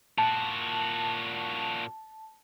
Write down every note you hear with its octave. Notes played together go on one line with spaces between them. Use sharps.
A#2 F#4 A5